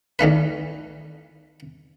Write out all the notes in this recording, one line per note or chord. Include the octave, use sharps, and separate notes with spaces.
E2 D#3 A3 B4